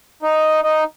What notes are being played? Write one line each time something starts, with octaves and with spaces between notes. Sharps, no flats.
D#4
D#4